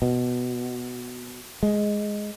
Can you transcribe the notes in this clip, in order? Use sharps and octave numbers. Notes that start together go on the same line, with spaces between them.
B2
G#3